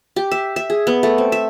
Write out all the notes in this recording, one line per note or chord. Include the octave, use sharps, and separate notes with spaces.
G4
E5
E5
G#4
B3
A3
C4
E5